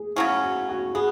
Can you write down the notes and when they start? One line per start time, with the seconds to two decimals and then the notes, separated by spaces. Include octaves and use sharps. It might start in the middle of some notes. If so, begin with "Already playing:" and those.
Already playing: G#4
0.16 C#3 F#3 C#4 E4
0.42 F#4
0.69 F#4
0.95 B3 G#4